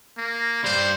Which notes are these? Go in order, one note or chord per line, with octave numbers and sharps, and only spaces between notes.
A#3
G2 G3 C5